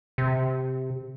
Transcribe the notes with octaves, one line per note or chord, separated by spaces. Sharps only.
C3